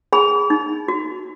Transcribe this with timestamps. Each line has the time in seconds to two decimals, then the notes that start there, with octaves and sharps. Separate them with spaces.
0.13 G#4 G#5 B5
0.50 D#4
0.88 F#4